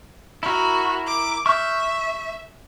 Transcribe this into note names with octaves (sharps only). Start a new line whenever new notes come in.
E4 F#4 A#4
D6
E5 C#6 F6 G6